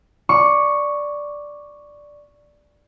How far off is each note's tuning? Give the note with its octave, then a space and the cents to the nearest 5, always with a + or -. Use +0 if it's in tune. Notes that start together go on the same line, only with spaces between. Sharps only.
D5 +0 C#6 +0